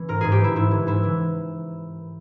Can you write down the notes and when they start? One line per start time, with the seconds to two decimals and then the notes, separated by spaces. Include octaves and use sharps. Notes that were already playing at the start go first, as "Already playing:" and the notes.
Already playing: E3 C#4
0.08 G#2 A#4
0.21 G#2 G#4
0.32 G4
0.40 E3 E4
0.56 G#2 E4
0.71 E3
0.87 G#2 E4
1.03 E3